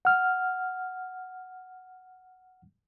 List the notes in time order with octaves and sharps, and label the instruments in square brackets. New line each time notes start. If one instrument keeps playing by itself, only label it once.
[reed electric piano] F#5 F6